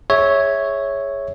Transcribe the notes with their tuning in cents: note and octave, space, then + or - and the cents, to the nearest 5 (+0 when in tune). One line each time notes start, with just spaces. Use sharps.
G#4 +0 C#5 +0 E5 -15